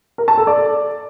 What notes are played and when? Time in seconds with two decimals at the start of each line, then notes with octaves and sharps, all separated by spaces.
0.18 A#4
0.28 A5
0.38 A4
0.47 D5